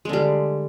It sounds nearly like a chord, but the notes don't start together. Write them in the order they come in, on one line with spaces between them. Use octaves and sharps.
G#3 D3 G3